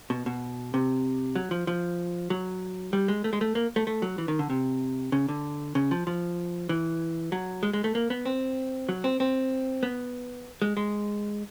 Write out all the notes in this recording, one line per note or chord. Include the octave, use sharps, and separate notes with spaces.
B2
B2
C3
F#3
F3
F3
F#3
G3
G#3
A3
G#3
A3
A#3
A3
A3
F#3
E3
D#3
D3
C3
C#3
D3
C#3
F3
F3
E3
F#3
G#3
G#3
A3
A#3
B3
C4
F#3
C4
C4
B3
G#3
G#3